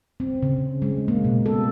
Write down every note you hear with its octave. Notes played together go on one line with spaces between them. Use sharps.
C4
C#3
G#3
A#3
B2
A4